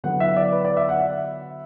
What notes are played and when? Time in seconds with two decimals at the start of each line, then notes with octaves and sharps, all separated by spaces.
0.04 D3 F#3 B3 E4 F#5
0.20 E5
0.37 D5
0.52 B4
0.65 D5
0.77 E5
0.89 F#5
1.01 E5